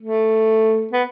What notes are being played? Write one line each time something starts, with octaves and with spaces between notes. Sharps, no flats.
A3
B3